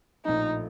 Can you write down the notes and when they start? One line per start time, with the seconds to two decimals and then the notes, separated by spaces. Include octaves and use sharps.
0.25 A#1 A2 F3 A3 D#4